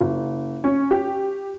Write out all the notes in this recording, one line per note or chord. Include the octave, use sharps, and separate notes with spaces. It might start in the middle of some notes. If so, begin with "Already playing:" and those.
F#1
C#4
G4